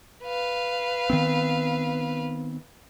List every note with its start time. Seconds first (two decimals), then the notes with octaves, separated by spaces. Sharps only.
0.24 B4 F5
1.10 D#3 B3 C4